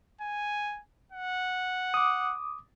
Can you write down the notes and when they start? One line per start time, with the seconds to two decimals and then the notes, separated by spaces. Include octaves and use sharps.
0.21 G#5
1.12 F#5
1.94 D6 D#6